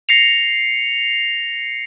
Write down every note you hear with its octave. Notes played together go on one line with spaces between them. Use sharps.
A#6 C7 C#7 F7